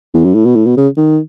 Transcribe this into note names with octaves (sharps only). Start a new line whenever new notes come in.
E2
F#2
A2
B2
A2
B2
C#3
D#3